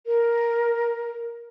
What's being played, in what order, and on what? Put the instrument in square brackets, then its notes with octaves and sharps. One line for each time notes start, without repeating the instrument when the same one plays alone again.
[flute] A#4